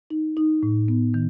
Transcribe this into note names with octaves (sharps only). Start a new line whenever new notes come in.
D#4
D#4
A2
B3
D#3